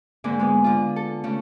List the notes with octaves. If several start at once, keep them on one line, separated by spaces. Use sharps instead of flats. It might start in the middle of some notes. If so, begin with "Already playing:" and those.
G#2 D3 A#3 C4
G#3 B3
D3 F4
A4
C#3 A3